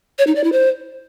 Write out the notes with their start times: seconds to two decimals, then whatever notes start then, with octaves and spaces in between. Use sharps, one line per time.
0.19 C#5
0.27 D#4
0.35 D5
0.44 E4
0.52 C5